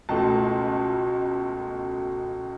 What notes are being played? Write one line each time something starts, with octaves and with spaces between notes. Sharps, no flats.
C#2 B2 A3 A5